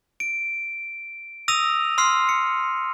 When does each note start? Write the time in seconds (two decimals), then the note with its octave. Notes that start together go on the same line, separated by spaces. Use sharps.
0.20 D7
1.48 D#6 E6 A#6 D#7 F7
1.98 C6 E6 F6 C7
2.29 C#7